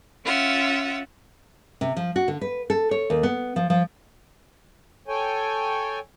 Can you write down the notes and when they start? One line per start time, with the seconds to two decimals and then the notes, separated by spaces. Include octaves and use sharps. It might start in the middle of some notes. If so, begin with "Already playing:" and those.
0.25 C#4 F4 E5 F#5
1.81 C3
1.97 F3
2.16 F#4
2.28 D3
2.41 B4
2.70 A4
2.91 C#5
3.10 D#2
3.23 B3
3.56 F3
3.70 F3
5.08 A4 C#5 G5 G#5